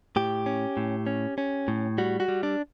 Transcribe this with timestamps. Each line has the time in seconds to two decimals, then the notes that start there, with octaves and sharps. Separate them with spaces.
0.16 A2 G4
0.46 C#4
0.77 A2
1.07 C#4
1.38 C#4
1.68 A2
1.98 G3 F#4
2.20 F#4
2.28 G3
2.43 D4